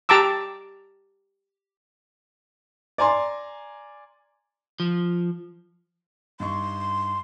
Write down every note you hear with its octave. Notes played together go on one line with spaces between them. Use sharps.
G4 A5 A#5 D6 E6
D5 G#5 A#5 C6
F3
G2 D#4 C6 C#6